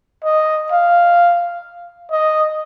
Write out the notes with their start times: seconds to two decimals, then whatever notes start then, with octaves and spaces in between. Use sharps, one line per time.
0.25 D#5
0.72 F5
2.11 D#5